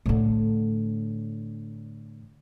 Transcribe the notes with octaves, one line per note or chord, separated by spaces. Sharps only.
A2 D3